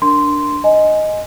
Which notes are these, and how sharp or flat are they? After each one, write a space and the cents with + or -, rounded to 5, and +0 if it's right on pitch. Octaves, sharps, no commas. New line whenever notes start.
D4 +0 A#4 +0 C6 -5
D#5 +0 G#5 +15